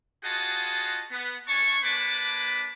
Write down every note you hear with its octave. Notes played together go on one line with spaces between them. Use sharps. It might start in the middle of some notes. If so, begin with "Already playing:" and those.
F4 F#4 G#4 D#5 F#5 A5
B3
D4 G#5 A5 C#6
A#3 D4 B4 A5 B5 D6